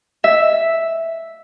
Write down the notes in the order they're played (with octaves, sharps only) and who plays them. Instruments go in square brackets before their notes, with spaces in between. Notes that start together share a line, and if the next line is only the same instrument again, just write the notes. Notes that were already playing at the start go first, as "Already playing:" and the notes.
[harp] E5